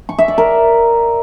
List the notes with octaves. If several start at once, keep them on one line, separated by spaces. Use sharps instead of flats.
C#6
E5
D5
A#4